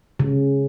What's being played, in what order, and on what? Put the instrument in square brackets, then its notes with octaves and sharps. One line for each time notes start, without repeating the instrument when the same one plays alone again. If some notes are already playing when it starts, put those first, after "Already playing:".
[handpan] C#3